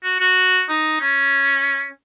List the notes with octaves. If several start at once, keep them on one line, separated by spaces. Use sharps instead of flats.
F#4
F#4
D#4
C#4